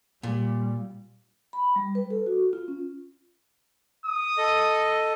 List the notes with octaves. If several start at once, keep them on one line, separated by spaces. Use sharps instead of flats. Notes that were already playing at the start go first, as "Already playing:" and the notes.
A#2 G3
B5
G3
B4
A4
F#4
F4
C#4
D#6
A4 D#5